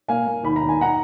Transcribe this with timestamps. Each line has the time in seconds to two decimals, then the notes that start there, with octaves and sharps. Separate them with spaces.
0.08 A#3 F5 G#5
0.27 A#3
0.43 D#2 B5
0.56 A#5
0.62 D#2
0.69 G#5
0.79 D#4 F#5 A#5